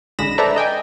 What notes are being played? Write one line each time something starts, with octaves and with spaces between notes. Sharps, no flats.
A1 D3 G#3 B5 A#6 E7
A4 B4 C5 D5 E5 A#5
D#5 G5 G#5